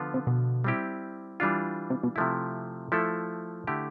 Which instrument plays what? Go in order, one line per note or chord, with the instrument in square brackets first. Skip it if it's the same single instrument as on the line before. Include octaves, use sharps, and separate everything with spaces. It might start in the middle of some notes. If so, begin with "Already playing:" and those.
Already playing: [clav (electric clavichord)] D3 F3 B3 F4
[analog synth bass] C3
B2
[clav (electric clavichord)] G3 C4 E4 G4
E3 G3 D4 F4
[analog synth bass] C3
B2
[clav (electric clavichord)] C3 F3 A3 E4
F3 A3 E4 A4
D3 A3 E4 G4